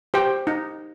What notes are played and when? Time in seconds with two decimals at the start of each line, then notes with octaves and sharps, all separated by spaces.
0.14 G4 C5 G5
0.47 D#4